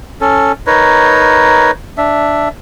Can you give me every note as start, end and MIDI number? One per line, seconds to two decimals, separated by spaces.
0.21 0.52 61
0.21 0.52 69
0.67 1.71 63
0.67 1.71 70
0.67 1.71 71
0.67 1.71 73
1.97 2.49 62
1.97 2.49 76